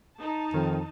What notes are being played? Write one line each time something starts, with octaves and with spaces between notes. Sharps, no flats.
D#4 A5
F2 D#3